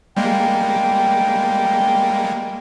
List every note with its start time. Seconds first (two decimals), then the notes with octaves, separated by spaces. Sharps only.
0.17 G3 G#3 A#3 G5